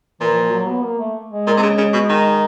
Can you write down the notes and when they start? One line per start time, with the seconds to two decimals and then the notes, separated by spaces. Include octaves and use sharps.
0.20 A#2 E3
0.31 E3
0.35 F3
0.51 F#3
0.68 B3
0.83 A#3
0.99 A3
1.31 G#3
1.47 A#2
1.57 C3
1.63 C#3
1.78 C#3
1.93 B2
2.09 D#3